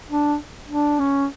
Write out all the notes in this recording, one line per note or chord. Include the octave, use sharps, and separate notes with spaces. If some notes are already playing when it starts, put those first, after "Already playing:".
D4
D4
C#4